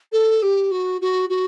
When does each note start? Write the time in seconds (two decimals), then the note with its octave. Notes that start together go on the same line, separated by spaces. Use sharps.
0.12 A4
0.42 G4
0.71 F#4
1.01 F#4
1.29 F#4